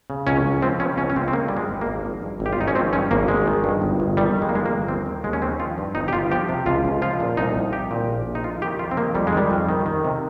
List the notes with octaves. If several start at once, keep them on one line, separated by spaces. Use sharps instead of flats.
C#3
C#2 C#4
C#2
F3 C4
C#3 C#4
C#2 C#4
C#4
C#2 C4
C4
D#3 A#3
G2 G3
G#3
G#1
A#3
G#1
F3
G2
G#1
G4
F4
G#1 D#4
C#4
F3 C4
G2 C#4
G#1 A#3
G#1 G#3
D#3
G2
G1
G1
D#3 G3
F2
G#3
A#3
G1 G#3
A#3
G1
D#2 C4
D#3
D#2 G#3
C#4
D#3 C4
F3 F4
G2
G1 D#4
G4
G1 F4
F3 G4
C3
C#2 F4
C#2
F3 F4
A#2
C2 D#4
C2
F3 G4
A#2
A#1
A#1
D#4
F2 F4
D#3 G4
F2 F4
C4
D#3 A#3
F2 G3
G#3
D#3 G3
F2
D#3
D#3
C3